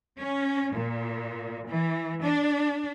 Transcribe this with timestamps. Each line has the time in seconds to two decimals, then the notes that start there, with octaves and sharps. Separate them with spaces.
0.18 C#4
0.74 A#2
1.67 E3
2.22 D4